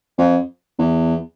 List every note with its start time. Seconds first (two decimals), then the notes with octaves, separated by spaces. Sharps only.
0.18 F2
0.79 E2